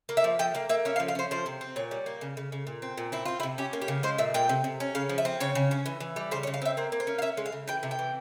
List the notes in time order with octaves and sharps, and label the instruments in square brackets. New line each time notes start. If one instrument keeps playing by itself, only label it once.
[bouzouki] A#3
E5
F3
F3 G5
A#3 F5
A#3 E5
C#4 E5
F5
F3
F5
C#4 C5
F3 C5
C3
C4
A#2 C#5
G3
A#3
C#3
C#3
C#3
A#2
C4
A#2
C4 E4
C4 F4
E4
C3
C#4 G4
A#3
G4
C#3
G#3 C5
A#2 E5
A#2 G5
C3
C3
C#4
C#3 F5
F3
E5
C4
C#3 C#5
C#3
C#4
E3
E3
G3
C#3 C5
C#5
C#3
F5
C4 E5
A#3 C5
A#3
C5
C#4
F5
C#4 E5
G#3
F5
C#3
E3 G5
C3
G5
E3